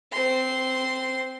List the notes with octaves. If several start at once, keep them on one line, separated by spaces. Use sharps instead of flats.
C4 C6